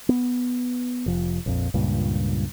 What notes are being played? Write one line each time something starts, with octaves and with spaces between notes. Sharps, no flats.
B3
F1 F3
A#1 F2
C#2 G2 A#2